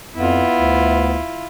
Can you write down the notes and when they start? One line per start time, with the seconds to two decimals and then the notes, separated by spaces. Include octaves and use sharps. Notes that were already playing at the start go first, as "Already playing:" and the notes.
0.15 F2 B3 E4 F4
0.59 D2